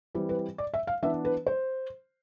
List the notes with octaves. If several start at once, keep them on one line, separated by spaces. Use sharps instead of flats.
E3 G3 C4
B4
D5
E5
F5
E3 B3 D4 E5
B4
C5